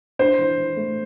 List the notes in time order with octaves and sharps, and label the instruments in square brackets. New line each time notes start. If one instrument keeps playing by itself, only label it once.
[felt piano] D4 [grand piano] C5
[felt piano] E3
E3
A3